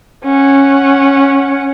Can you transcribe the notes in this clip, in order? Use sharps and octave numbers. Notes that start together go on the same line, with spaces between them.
C#4 F#5